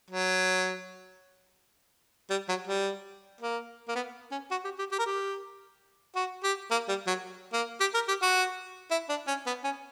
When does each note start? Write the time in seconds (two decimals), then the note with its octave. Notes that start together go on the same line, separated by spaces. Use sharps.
0.10 F#3
2.30 G3
2.48 F#3
2.67 G3
3.41 A#3
3.88 A#3
3.95 B3
4.31 C#4
4.51 F#4
4.64 G4
4.78 G4
4.92 G4
4.99 A#4
5.06 G4
6.16 F#4
6.43 G4
6.71 A#3
6.88 G3
7.07 F#3
7.53 A#3
7.80 G4
7.94 A#4
8.08 G4
8.22 F#4
8.91 E4
9.09 D4
9.27 C#4
9.46 B3
9.64 C#4